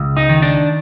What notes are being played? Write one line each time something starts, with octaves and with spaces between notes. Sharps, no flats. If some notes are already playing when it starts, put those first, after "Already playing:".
Already playing: C#2
D#4
D#3
D4